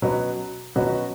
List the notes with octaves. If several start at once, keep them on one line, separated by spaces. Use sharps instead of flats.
B2 F#3 C#4 F#4 B4
B2 F#3 C#4 F#4 B4